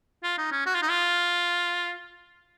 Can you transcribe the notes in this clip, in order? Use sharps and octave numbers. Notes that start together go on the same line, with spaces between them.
F4
D#4
C#4
F#4
F4
D#4
F4